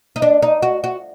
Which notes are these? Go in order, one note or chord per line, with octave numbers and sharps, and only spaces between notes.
D#4
D4
D#4
F#4
F#4